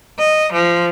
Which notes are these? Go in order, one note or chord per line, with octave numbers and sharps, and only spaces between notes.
D#5
F3